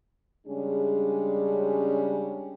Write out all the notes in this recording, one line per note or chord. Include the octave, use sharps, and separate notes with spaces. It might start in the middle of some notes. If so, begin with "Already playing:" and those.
C#3 G3 G#3 C#4 D4 G#4